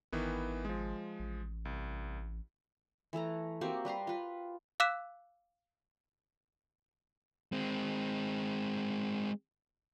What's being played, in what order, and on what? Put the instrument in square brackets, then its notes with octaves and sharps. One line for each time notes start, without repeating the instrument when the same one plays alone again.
[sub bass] G#1 [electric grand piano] D#3 E3 B3
[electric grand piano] F3 G#3
[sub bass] A1
[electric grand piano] C2
[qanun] E3 A3 A4 A#5
A#3 C4 F#4 G4
G3 B4 A#5 C6
F4 B4
[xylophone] F5 D6 E6 F#6 B6 E7
[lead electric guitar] G#3 C4